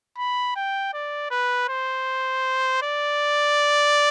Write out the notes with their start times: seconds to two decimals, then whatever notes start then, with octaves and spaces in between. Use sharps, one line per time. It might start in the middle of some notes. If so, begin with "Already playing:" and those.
0.18 B5
0.56 G5
0.94 D5
1.31 B4
1.69 C5
2.83 D5